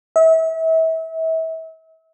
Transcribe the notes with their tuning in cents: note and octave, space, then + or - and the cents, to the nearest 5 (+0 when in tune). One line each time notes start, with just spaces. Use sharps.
E5 -35